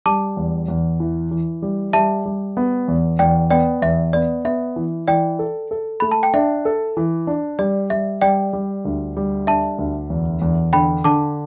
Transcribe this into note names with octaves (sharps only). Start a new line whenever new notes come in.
G3 A5 D6
E2
E2
E3
E3
G3
G3 E5 A5
G3
B3
E2
E2 D5 G5
B3 D5 G5
E2 E5
B3 D5
B3 E5
E3
E3 D5 G5
A4
A4
A3 B5
A5
G5
D4 E5
A4
E3
D4
G3 D5
G3 E5
G3 D5 G5
G3
D2
G3
D4 E5 A5
D2
E2
E2
D3 G5 B5
D3 A5 D6